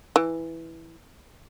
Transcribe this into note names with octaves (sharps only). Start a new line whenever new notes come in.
E3